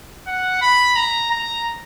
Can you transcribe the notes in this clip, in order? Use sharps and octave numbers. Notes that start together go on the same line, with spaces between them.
F#5
B5
A#5
A#5